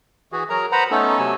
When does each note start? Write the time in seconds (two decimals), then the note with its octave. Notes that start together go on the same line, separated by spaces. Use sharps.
0.32 E3 F#4 G#4
0.50 F#3 G#4 A#4 A#5
0.72 B4 C5 F#5 A#5 B5
0.91 A3 B3 C#4 D#4 A4
1.19 C3 F#3 A3 G#5 E6